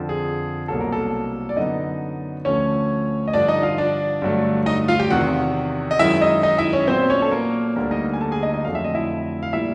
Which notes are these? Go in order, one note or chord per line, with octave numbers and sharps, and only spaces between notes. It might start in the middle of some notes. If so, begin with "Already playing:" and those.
Already playing: F2 D3 F3
G#4
C2 B2 F#3 A#3 A4
A#4
A4
D5
F#2 D3 F#3 B3 D#4 D#5
D2 D3 F3 A3 C#4 C#5
D#5
G2 D3 F3 D4 D5
D#4 D#5
F4 F5
D4 D5
G2 D3 F#3 A3
D#4 D#5
F4 F5
G4 G5
E2 C3 D#3 F#4 F#5
D#5
F#2 D#3 G#3 E4 E5
D#4 D#5
D#4 D#5
E4 E5
C#4 C#5
A#2 F#3 B3 C4 C5
C#4 C#5
A4
A#3 A#4
D2 D3 G3 A#3 A#4
D#4 D#5
G#5
A4 A5
G#4 G#5
D#4 D#5
D#4 D#5
F2 D3 F#3 A3 F5
E5
D#5
E4 E5
F5
A#2 G3 A#3 E4 E5